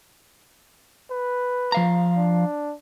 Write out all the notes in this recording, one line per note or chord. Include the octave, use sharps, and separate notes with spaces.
B4
F3 F5 A#5
D4